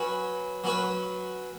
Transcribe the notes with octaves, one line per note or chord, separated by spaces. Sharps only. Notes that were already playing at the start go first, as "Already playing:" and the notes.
Already playing: F#3 C#4 F#4 B4
F#3 C#4 F#4 B4